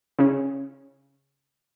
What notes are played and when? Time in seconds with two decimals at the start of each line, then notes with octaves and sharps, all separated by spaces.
0.19 C#3 C#4